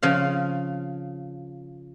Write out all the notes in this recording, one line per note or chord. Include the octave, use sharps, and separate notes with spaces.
C#3 F3 F5